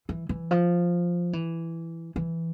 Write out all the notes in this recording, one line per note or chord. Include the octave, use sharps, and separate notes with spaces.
E3
E3
F3
E3
E3